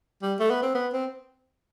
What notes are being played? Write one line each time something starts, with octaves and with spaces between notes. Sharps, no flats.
G3
A3
B3
C4
B3
C4